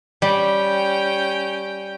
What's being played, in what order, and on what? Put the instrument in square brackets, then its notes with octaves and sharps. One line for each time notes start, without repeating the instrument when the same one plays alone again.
[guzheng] G3 [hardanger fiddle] C#4 G5